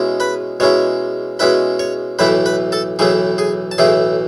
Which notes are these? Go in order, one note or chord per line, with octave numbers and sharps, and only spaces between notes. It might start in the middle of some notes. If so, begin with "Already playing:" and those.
Already playing: B2 G#3 C#4 E4
B4 B5
B2 G#3 C#4 E4 C#5 C#6
B2 G#3 C#4 E4 B4 B5
C#5 C#6
B1 A2 E3 A3 E4 B4 B5
B4 B5
A4 A5
B1 A2 E3 A3 E4 G#4 G#5
G#4 G#5
A5
B1 A2 E3 A3 E4 G#4 G#5